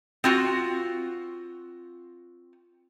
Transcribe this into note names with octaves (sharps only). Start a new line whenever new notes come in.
C4 F4 F#4